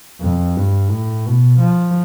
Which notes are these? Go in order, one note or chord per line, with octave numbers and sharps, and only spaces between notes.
F2
G2
A2
B2
F3